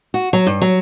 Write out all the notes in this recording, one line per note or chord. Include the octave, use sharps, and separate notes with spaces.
F#4
F#3
G2
F#3